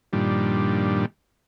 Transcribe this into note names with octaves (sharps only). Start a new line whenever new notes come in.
G2 A#2 D#3 F3 G3 D4